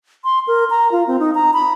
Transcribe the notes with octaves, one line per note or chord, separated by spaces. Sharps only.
C6
A#4
A#5
F4
C4
D#4
A#5
B5